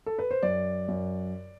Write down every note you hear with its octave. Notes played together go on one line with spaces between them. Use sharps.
A4
B4
C5
F#2 D5
F#2